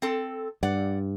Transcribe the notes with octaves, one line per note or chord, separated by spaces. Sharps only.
C4 A4
G2 D5 F#5